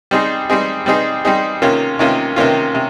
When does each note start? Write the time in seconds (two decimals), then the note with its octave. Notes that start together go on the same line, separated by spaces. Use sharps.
0.11 G3 C4 D#4 G#4
0.49 G3 C4 D#4 G#4
0.86 G3 C4 D#4 G#4
1.25 G3 C4 D#4 G#4
1.62 C3 D#3 A#3 C#4 F4
1.99 C3 D#3 A#3 C#4 F4
2.36 C3 D#3 A#3 C#4 F4
2.74 C3